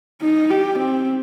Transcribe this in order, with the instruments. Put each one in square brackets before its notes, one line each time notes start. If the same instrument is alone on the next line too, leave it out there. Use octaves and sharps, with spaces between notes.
[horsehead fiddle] D#4
G4
C4